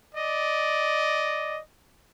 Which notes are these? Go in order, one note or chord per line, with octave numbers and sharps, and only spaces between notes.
D5 D#5